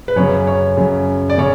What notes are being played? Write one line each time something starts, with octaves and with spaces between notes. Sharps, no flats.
B4
F#2 C#3 C#5
C#5
F#2 C#3
D5
C#3 C#5